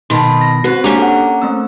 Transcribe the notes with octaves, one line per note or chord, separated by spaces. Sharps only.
B2 D#3 A5 B5 C6
A#6
C4 F#4 B4
A#3 C#4 D4 G4 A#5 D6
A4 F#5
A3 C4 E6